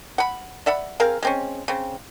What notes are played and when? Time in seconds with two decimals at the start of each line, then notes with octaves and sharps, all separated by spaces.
0.18 F#5 B5
0.66 D5 E5 F#5 B5
1.00 C4 G#4 A#4 F5
1.23 G#3 C4 C#4
1.68 C#3 C4